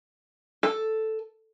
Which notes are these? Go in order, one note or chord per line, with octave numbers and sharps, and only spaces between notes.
A4